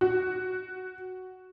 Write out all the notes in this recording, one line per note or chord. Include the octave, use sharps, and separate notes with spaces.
F#4